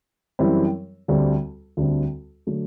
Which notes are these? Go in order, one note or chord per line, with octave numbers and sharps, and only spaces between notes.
F#2 E3 G3 C4 E4
D2 D3 G3 C4
D2 D3 G3 C4
D3 F#3 A3